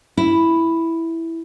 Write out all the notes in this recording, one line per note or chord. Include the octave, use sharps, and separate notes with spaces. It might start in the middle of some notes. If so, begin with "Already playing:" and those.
E4